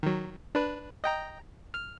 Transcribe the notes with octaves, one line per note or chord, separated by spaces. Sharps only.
D#3 F#3
D4 B4
D#5 G5 A#5
F6